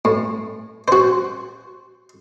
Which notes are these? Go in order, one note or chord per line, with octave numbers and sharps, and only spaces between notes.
A2
F#4 C5